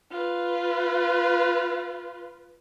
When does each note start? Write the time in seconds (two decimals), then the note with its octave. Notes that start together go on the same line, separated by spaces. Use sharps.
0.11 F4 B4